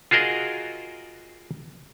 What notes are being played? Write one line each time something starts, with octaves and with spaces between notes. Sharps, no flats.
F4 F#4 G#4 A#4 D#5